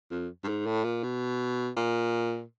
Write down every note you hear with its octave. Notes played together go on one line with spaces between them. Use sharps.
F2
G2
G#2
A2
A#2
B2
A#2